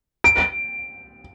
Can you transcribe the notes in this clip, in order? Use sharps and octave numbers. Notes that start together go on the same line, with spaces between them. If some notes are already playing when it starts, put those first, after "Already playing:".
D7